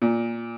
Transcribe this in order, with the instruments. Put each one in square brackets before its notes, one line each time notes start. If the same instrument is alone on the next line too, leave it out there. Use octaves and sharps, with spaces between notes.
[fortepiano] A#2